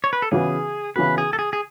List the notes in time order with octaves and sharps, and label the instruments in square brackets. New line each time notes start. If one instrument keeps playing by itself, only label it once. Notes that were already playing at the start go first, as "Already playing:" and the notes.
[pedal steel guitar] C#5
B4
A4
[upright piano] C#3 E3 B3 F#4 [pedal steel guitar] G#4
[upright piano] C#3 E3 B3 F#4 [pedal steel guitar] B4
[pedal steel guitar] G#4
A4
G#4
G#4